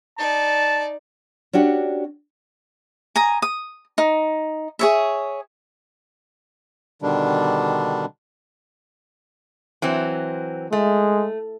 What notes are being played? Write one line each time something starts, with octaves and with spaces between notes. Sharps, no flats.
D#4 D5 A5
C#4 D4 F#4 G4
G#5 A#5 D#6
D#6
D#4
G#4 C#5 E5
B2 D3 D#3 G3 D4
E3 F#3 C4
G#3 A3